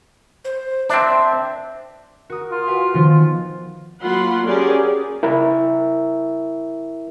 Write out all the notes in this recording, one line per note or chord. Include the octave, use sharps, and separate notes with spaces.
C5
C4 D4 E5
F#4 A#4 D#6
F4
F#4 B4 F5 G#5
D#3 F3 B3
F#3 A#3 F4 F#5 B5 C6
C#4 G4 G#4 A#4 D5
E4 A#4 E5